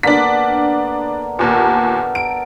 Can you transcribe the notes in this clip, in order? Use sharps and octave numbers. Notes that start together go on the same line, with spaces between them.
D3 A#3 B3 D4 B6
D#2 A#2 B3 A4 A#4
D7